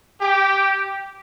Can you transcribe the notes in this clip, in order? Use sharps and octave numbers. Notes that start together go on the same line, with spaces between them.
G4